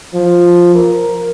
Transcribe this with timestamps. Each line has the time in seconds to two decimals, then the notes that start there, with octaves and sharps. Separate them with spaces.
0.14 F3
0.75 A#4